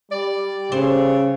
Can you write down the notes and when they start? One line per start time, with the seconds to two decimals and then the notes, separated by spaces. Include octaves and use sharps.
0.12 G3 D5
0.72 C#3 A4 C5 D5